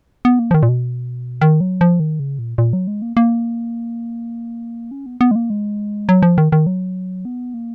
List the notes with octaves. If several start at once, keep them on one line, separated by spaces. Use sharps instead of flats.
B3
A#3
F3
D#3
A#2
B2
D#3
F#3
F3
D#3
C#3
A#2
A#2
F#3
G#3
A#3
A#3
C#4
B3
B3
G#3
A#3
G#3
F#3
F3
D#3
D#3
F#3
B3
A#3